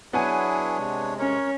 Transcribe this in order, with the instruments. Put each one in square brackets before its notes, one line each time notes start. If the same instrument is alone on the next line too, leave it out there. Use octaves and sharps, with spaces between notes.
[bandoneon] F#3 E4 G#4 [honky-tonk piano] B3 F#5 G#5 [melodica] D4 C#5
[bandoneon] C3 G#3
[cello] C#4 [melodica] A#4 C#5